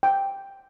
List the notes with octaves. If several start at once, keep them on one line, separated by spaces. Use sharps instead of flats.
G5